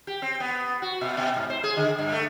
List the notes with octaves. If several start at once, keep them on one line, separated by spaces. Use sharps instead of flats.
G4
C4
B3
F#4
B2
B2
G#2
C5
G#4
D3
G2
A3